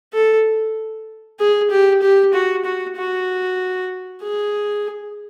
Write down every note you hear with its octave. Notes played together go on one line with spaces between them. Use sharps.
A4
G#4
G4
G4
F#4
F#4
F#4
G#4